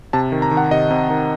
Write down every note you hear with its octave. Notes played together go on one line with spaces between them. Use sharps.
C3 A5
D#3
A#5
D#3
F#5
C3 D#5
C3
D#3